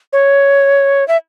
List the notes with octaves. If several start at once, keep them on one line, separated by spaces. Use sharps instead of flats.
C#5
E5